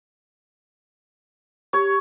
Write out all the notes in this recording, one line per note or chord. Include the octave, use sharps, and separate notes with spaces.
G4 C#5